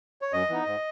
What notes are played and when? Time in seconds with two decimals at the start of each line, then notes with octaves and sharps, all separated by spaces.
0.22 C#5
0.33 F#2 D#5
0.50 E3 B3 D#4
0.66 G#2